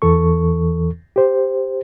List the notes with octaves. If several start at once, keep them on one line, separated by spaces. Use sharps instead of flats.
E2 E3 A4 C#6
G4 C5